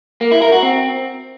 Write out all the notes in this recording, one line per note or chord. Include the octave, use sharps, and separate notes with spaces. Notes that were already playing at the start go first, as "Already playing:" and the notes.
A#3
E4
A#4
F#4
C4